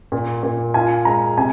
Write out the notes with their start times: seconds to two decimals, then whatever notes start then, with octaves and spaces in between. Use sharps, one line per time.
0.12 A#2
0.43 A#2
0.74 F4 G#5
1.05 G#3 A#5
1.38 C3 G#5